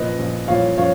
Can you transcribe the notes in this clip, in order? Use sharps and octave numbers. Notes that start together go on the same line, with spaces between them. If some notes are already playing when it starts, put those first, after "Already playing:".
Already playing: A#2 F3 B4 D#5
A#2 F3
A#2 F3 C#5 F5
F3 C#5 F5